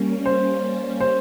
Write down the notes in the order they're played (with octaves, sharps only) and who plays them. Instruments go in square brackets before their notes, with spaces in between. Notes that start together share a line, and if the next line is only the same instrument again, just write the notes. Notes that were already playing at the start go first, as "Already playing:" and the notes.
Already playing: [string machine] G3 A#3 C#4
[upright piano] C5
C5